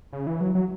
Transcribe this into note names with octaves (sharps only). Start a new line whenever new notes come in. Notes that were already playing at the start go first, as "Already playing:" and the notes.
C#3
E3
F#3
F#3